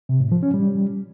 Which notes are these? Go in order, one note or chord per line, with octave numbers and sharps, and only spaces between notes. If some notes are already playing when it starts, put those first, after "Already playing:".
C3
A2
F3
C#4
G3